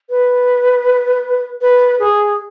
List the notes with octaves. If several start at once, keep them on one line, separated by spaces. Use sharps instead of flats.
B4
B4
G#4